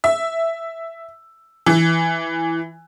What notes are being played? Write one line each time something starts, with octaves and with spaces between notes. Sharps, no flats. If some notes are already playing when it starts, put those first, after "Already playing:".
E5
E3